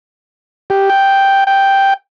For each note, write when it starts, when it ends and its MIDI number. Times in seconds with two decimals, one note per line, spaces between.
0.70 0.90 67
0.90 1.44 79
1.47 1.94 79